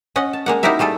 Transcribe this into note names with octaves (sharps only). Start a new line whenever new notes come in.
C#4 D#5 F#5
A5
G#3 A#3 F#5
D#4 E4 F#4 G4 A#4 E5
G3 A3 G#4 A4